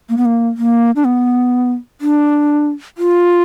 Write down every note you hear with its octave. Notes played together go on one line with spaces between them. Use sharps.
A#3
B3
A#3
A#3
D4
B3
D4
F4